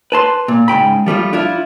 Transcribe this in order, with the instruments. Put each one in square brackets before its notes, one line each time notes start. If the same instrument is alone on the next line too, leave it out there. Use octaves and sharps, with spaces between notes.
[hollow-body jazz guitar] B4 A5 C6
A#2
G#2 C#3 G5 B5
F3 G3 A3 F4
D4 E4 F4